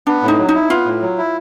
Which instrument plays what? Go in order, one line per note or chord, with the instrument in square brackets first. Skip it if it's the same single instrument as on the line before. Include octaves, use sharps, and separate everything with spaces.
[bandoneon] B3 [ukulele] D4
[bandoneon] A2
[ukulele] D#4
[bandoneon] F#3
[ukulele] D#4
[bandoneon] E4
[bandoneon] B3 [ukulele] F4
[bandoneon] A2
F#3
E4